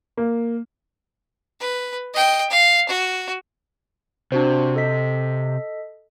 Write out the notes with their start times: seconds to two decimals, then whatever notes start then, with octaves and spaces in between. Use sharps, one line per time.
0.17 A#3
1.60 B4
2.14 D#5 G5
2.50 F5
2.88 F#4
4.32 C3 D4 F#4 C5
4.76 A4 D#5 B6